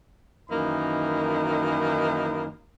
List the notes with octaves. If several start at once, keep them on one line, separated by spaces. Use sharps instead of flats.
F#2 D#3 E3 A#3 D#4 B5